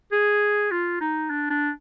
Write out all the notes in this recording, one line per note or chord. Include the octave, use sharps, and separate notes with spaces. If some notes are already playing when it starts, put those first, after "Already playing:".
G#4
F4
D#4
D4
D4